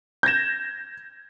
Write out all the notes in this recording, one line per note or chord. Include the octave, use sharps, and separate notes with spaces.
G6 G#6 A#6 E7